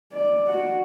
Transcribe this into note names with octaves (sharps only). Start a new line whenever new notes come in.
D5
F#4 F#5